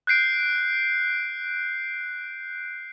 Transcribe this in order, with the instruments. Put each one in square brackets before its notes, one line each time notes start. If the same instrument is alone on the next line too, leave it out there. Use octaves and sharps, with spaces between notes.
[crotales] F#6 G6 C7 D7